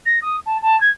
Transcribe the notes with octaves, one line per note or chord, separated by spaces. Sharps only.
A#6
D#6
A5
A5
G#6